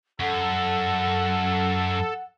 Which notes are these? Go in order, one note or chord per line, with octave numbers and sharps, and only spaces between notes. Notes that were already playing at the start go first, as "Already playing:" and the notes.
F#2 A4 F#5